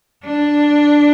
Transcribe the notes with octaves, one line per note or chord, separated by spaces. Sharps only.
D4